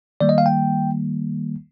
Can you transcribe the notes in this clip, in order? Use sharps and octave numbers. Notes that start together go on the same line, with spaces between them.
D#3 G3 A#3 D5
D#5
F5
G5